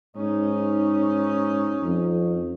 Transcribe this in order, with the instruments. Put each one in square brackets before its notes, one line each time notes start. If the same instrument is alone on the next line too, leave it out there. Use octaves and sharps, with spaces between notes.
[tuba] G#2 [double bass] C#4 D#4
[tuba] F2